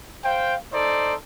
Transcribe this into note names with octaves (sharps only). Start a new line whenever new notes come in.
C5 F5 G5
D#4 A4 C5 D5